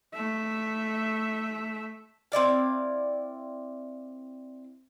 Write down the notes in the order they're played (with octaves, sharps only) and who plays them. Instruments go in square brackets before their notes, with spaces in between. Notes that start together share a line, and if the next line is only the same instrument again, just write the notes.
[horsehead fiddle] A3 E5
[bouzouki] C4 E4 D5 F5